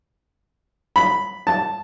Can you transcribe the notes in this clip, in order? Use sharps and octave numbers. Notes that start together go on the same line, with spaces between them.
B5
A5